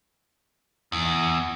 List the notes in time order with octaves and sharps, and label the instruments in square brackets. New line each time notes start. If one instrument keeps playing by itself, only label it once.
[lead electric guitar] E2